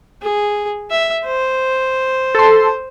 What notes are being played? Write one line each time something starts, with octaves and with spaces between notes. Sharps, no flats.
G#4
E5
C5
A4 C6